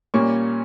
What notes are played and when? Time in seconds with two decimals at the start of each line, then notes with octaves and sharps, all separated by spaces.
0.14 A#2 G3 A#3 C#4 C#6